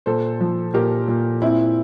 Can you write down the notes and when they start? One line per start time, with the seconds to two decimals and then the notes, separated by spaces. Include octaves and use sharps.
0.06 A#2 A4 C5
0.41 F3
0.74 A#2 G4 A#4
1.08 A#2
1.41 A#2 C4 E4